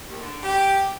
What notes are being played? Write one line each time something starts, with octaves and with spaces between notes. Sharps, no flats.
D#2
D3
G4